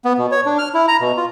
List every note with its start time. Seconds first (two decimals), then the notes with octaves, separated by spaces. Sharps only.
0.05 B3
0.18 B2
0.32 C#5
0.46 D4
0.58 F6
0.74 E4
0.88 A#5
1.01 B2
1.17 F4